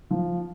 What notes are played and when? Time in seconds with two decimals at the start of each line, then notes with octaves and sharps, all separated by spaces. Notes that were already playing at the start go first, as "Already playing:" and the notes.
0.11 F3